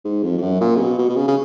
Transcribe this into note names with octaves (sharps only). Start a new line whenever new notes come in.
G#2
F2
F2
F#2
A#2
C#3
B2
B2
B2
C#3
C#3